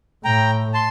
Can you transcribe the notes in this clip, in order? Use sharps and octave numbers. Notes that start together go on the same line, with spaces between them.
A2 G5 A#5
A5 C6